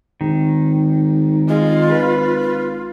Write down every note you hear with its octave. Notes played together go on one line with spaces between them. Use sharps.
G#1 D#3
G#3 F4
B4